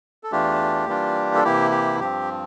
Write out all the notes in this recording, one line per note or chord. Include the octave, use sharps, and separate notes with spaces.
A4
E2 E3 A3 D4 F4 G4
E3 G3 A#3 D4 F4
A4
C3 E3 A#3 E4 G4
G4
G2 F3 C4 G4